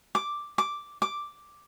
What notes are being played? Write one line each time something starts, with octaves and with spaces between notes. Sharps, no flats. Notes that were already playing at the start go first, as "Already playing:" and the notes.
D6
D6
D6